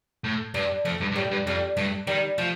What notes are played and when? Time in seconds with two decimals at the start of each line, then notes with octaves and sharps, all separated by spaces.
0.24 A2
0.54 G2 D4
0.85 F2 A3
1.01 G2
1.12 G2
1.16 A2 G3
1.31 G2
1.46 F2 G3
1.77 G2 A3
2.07 D#3 G3
2.38 F3 A3